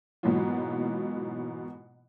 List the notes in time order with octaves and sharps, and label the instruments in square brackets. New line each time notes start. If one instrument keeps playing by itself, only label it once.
[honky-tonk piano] G#2 B2 E3 F#3 A#3 F4